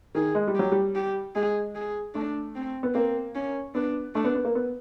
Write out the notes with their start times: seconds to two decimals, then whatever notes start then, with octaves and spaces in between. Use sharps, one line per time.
0.15 D#3 G#4
0.35 G#3
0.47 G3
0.55 F#3 G4
0.72 G3
0.95 G4
1.35 G#3 G#4
1.75 G#4
2.15 A3 D4
2.55 C4
2.83 B3
2.94 A#3 C4
3.35 C#4
3.75 B3 D4
4.15 A3 D4
4.25 B3
4.35 B3
4.45 A#3
4.55 B3